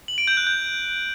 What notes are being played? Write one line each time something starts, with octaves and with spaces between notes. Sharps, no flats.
F#7
D7
G6
F#6
G6